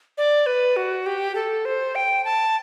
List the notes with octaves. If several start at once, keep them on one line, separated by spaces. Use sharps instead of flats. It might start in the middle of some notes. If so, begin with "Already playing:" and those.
D5
B4
F#4
G4
A4
C5
G5
A5